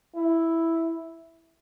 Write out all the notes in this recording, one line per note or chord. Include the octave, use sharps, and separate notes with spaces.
E4